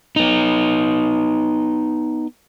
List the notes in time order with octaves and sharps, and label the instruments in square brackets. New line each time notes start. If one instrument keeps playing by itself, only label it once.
[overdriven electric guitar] B3 D#4